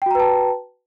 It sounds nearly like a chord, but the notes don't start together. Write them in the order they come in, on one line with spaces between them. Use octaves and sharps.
G5 F#4 A#5 B4 A5